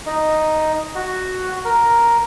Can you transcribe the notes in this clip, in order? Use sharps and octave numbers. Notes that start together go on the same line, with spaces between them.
D#4
F#4
A#4